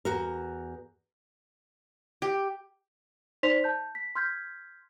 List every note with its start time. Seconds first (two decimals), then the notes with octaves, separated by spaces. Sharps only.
0.05 E2 F#4 A#4
2.22 G4
3.43 D#4 C5 D5 C6 B6 F7
3.64 A5 G6
3.95 B6
4.15 C6 F6 G6 G#6 B6